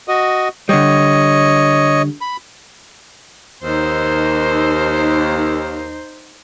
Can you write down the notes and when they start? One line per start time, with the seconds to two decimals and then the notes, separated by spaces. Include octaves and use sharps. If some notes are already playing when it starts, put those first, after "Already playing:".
0.08 F#4 D#5
0.69 D3 G3 C#5 D#5
2.21 B5
3.63 D#2 D#4 C5